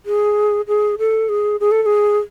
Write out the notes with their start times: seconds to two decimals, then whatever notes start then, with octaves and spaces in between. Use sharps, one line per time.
0.06 G#4
0.68 G#4
0.99 A4
1.29 G#4
1.60 G#4
1.71 A4
1.82 A4
1.86 G#4